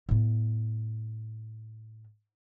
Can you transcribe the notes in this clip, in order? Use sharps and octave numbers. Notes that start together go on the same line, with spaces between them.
A2 B3